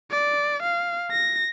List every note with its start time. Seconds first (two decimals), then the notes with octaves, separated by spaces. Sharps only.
0.11 D5
0.62 F5
1.11 A#6